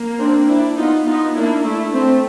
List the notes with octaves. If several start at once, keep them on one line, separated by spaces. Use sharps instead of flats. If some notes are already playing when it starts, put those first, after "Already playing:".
Already playing: A#3
C4 D4
D4 E4
B3 D#4 F4
B3 D#4 F4
A#3 D4 E4
A3 D4 E4
A3 C4